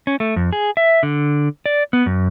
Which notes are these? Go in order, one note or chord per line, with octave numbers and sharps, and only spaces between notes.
C#4
A3
F2
G#4
E5
D3
D5
B3
F#2